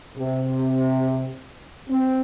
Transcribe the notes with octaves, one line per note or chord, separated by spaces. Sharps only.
C3
C4